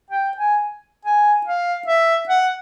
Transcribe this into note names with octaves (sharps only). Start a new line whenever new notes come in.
G5
G#5
G#5
F5
E5
F#5